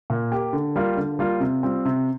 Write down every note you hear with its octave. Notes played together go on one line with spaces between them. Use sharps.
A#2
A#3 G4
D3
G3 A#3 F4
D3
G3 A#3 F4
C3
G3 C4 F4
C3